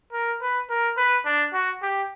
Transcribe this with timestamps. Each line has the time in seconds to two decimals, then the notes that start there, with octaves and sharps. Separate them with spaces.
0.12 A#4
0.41 B4
0.70 A#4
0.97 B4
1.26 D4
1.53 F#4
1.82 G4